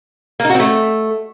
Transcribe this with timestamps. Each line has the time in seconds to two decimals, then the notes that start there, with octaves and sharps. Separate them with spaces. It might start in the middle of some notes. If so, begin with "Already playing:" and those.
0.40 A#3
0.45 D#4
0.50 F#4
0.55 C4
0.60 A3